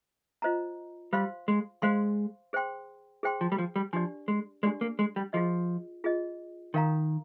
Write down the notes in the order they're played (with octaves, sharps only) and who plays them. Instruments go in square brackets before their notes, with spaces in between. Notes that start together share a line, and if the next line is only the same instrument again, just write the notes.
[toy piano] F4 C5 D#5 A#5
[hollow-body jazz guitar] G3 [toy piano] C5 F5 C6
[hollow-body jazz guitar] G#3
[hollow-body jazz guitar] G#3 [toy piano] C5 F5 C6
[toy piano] G#4 C5 G5 C6
G#4 C5 G5 C6
[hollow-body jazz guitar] F3
G3
F3
G3
[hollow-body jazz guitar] F3 [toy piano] D4 G4 D5
[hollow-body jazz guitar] G#3
[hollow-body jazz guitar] G#3 [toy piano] D4 G4 D5
[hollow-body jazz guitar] A#3
G#3
G3
[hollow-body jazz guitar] F3 [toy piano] F4 G#4 D#5
[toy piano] F4 G#4 D#5
[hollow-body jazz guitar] D#3 [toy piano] A#4 F5 A#5